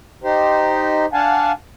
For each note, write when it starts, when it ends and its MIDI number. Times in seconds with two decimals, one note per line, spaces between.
0.24 1.06 63
0.24 1.06 67
0.24 1.06 72
1.13 1.52 62
1.13 1.52 77
1.13 1.52 78
1.13 1.52 80
1.13 1.52 81